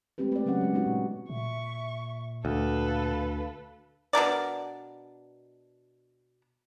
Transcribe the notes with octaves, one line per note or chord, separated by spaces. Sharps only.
G#3 A3 C4 G4 B4
B4 D5
C#3 F#3 C#4 G#4 F#5
G#3 G#4
G#3 B3 D#4 F#4
A#2
A#2 E5 C#6
D2 A4 B4 F5
B2 D4 A#4 D5